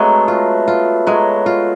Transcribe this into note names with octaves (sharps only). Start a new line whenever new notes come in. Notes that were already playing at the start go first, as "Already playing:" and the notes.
Already playing: F#3 G#3 A3 B3 C4
F4
F4
F#3 G#3
F4